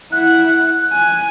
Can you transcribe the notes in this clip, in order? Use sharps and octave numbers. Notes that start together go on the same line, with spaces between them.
E4 F#5 F#6
G#5